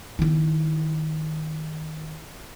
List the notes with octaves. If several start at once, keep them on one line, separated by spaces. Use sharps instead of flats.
D#3 E4